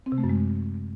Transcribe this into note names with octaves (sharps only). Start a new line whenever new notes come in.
C4
C3
A3
F#2
G#3